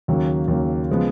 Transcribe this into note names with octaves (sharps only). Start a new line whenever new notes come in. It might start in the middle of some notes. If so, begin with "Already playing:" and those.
D#2 C#3 F#3 A#3
D#2 C#3 F#3 A#3
C#3 F3 G#3 B3